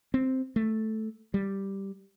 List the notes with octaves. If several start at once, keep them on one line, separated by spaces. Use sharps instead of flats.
C4
A3
G3